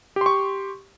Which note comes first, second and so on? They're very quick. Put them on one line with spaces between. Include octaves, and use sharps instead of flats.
G4 C6 C#6